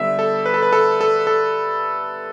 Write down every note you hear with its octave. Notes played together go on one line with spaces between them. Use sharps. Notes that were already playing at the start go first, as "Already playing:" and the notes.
Already playing: D3 G3 B3 E5
A4
B4
A4
B4
A4
A4
A4